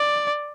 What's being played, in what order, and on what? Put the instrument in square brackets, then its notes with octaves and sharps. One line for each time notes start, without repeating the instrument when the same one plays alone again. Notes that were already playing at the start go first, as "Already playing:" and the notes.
Already playing: [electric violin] D5